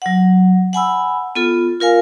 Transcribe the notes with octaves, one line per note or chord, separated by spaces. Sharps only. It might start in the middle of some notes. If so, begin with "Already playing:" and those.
F#3 F#5
F#5 G#5 B5 E6
B3 F4 A4
F4 A#4 F5 G#5